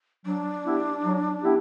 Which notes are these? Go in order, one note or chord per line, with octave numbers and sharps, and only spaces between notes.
F#3 D4
B3 E4 G4
F#3
B3 E4 G4